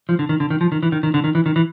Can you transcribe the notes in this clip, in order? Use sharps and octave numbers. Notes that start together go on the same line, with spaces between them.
F3
D3
D#3
D3
D#3
F3
D#3
E3
D#3
D#3
D3
D#3
E3
D#3
E3